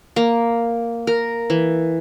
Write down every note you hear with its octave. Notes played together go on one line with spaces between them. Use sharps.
A#3
A#4
E3